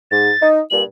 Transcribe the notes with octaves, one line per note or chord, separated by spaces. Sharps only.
G#2 A6
D#4
G2 A#2 F#7